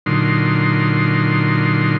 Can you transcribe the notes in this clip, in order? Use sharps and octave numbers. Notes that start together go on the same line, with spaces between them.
A#2 D3 F#3 D#4 C6